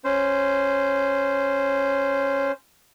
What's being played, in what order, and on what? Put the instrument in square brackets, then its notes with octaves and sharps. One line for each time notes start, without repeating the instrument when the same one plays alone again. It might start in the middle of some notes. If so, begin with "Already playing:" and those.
[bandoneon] C#4 C5